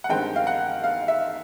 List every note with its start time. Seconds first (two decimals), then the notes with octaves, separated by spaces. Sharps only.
0.04 F#5
0.09 G2 D#3 G#3 C4 G5
0.36 F5
0.47 F#5
0.84 F5
1.08 E5